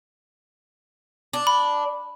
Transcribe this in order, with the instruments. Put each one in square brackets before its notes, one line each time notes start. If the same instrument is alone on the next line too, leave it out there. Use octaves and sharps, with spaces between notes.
[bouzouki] D4
[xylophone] B5